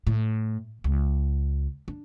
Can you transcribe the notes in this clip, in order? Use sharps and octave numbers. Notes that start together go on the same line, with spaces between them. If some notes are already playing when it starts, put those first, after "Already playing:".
A2
C#2
D4